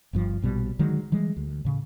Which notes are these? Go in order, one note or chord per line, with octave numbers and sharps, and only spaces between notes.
G1 G2 F3
A#1 B2 F3 G3
D3 D#3 F#3 G#3
E3 G3 G#3
D2
A2 C#3